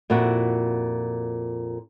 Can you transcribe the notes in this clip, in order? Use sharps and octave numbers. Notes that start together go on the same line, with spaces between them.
F2 A#2 E4 F#4